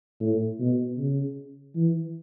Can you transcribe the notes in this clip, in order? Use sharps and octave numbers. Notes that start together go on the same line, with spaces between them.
A2
B2
C#3
E3